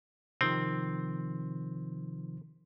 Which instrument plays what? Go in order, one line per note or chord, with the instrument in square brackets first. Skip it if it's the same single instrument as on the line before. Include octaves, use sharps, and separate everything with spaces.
[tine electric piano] C3 D#3 F3 [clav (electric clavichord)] C4